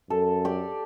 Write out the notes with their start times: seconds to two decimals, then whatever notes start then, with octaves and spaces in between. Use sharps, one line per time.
0.10 F#2 A4
0.45 G4 D5